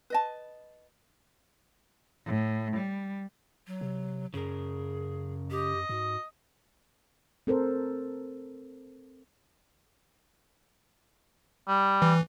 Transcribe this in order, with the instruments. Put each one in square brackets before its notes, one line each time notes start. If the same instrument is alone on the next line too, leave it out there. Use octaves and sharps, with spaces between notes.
[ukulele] B4 D#5 A5
[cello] A2
G3
[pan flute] F#3
[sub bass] C3
[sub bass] F#2 [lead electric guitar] C#3 A#4 [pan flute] G#4
[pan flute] G4 [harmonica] D#5
[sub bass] G#2 [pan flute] F#4
[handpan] C4 A4 A#4 C5
[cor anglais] G3
[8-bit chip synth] E3